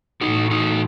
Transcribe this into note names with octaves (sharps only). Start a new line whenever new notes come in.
A2 E3 A3 D#4 F#4
D#4 F#4